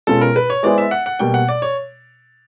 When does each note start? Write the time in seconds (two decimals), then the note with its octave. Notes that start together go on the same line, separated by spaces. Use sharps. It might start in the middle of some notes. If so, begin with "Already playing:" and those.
0.07 B2 G#3 C#4 F4 A4
0.21 A#4
0.36 B4
0.50 C#5
0.63 G#3 B3 E4 G#4 C5 D5
0.78 E5
0.91 F#5
1.06 F#5
1.19 B2 G3 A#3 G5
1.34 F#5
1.48 D5
1.62 C#5